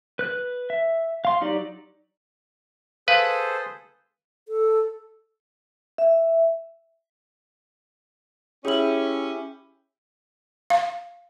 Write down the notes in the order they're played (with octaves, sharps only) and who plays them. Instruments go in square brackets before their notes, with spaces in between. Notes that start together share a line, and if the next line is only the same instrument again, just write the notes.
[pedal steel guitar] B4 F#6
E5
F5 C6
F#3 D#4 G4 D5
[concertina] G#4 A4 C5 [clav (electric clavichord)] B4 [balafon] F5
[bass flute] A4
[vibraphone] E5
[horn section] C#4 [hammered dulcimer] E4 G4 [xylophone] G#4 F#7
[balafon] F5